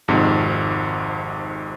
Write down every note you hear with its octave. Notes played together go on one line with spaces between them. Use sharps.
G#1 F2 G#2 C3